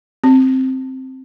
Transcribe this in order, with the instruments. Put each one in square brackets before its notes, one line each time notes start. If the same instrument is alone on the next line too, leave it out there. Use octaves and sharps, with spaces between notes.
[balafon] C4